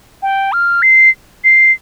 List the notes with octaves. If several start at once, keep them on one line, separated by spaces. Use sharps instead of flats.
G5
F6
C7
C7